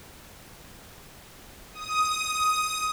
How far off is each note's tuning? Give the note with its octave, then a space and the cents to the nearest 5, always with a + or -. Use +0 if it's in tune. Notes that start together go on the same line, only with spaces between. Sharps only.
D#6 +10